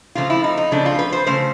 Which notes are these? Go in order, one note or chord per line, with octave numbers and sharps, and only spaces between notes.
C#3 F3 A3 F4
E4
D#4
D#4
C#3 F3 A3 D4
F4
B4
C5
C#3 F3 A3 C5